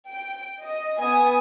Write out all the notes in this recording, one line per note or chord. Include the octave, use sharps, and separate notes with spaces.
G5
D#5
B3 G#5 D#6